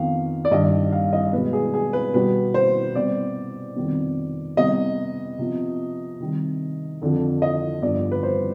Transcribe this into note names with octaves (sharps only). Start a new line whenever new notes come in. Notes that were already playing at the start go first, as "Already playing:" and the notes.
Already playing: F2 D#3 B3 F5
D5
G2 D#3 G3 D#5
F5
D#5
B2 G#3 B3 B4
G#4
G#4
B4
B2 G3 B3 B4
C5
C3 G3 B3 D5
F2 C3 D#3 G3 B3
C3 G3 B3 D#5
C3 F3 B3
C3 D#3 G3
F2 D3 F3
D#5
G2 D3 F3 B3 D5
B4
C5